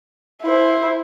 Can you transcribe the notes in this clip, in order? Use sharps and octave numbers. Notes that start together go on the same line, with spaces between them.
E4 C5